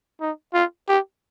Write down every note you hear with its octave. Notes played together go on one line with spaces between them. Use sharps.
D#4
F4
G4